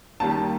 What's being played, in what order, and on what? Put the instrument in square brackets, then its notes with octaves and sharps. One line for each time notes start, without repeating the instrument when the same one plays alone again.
[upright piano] D#2 D#3 G3 A5